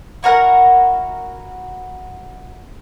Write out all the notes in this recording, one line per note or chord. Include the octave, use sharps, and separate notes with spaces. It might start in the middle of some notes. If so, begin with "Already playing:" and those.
E4 F#4 A#4 F#5